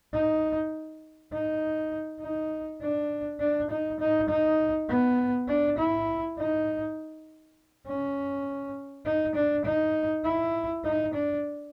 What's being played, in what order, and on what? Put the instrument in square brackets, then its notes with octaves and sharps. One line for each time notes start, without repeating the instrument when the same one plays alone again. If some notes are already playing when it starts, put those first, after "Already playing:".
[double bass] D#4
D#4
D#4
D4
D4
D#4
D#4
D#4
B3
D4
E4
D#4
C#4
D#4
D4
D#4
E4
D#4
D4